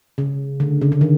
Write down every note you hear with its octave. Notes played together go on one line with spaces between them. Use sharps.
C#3
D3
C#3
D3
D#3